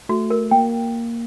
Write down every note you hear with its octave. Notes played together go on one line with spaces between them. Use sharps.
A3 F#4
A#4
A#3 G5